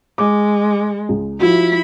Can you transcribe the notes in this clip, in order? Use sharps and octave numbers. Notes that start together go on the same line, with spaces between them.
G#3 D6
C#2
F3 E4 F#4 B5